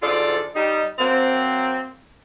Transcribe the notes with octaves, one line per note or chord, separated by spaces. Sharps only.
D2 G#2 F4 A4 D5
G3 D#4
F#3 A#3 C4